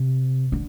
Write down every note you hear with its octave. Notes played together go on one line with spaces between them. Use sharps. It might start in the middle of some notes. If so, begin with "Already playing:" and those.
Already playing: C3
D3